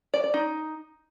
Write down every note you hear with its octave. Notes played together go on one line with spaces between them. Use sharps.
D5
D5
D#4